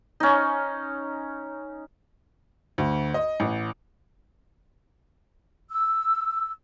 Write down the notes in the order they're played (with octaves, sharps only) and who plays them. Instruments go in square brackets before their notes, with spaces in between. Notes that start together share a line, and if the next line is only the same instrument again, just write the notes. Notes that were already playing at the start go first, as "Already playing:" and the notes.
[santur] C#4 D#4
[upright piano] D2
D#5
A1
[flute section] E6